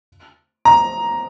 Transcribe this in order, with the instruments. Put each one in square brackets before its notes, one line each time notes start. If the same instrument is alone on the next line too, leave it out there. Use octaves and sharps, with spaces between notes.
[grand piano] A#5